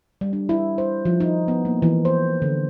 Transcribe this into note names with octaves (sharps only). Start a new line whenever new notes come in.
G3
D4
E4
C5
F3
D#4
B3
A#3
E3
C5
D3